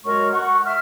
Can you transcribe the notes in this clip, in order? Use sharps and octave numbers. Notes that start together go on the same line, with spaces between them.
F#2 G#3 F#4 A#4 C#5 C#6
F#5 C#6
E5 F6